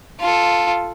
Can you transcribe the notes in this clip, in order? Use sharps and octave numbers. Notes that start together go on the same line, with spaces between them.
F4 A4